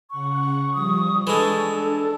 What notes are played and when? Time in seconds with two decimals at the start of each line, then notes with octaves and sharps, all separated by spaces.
0.10 C#3 F#5 C#6
0.74 F3 G3 D#6
1.27 E3 G#3 D4 A4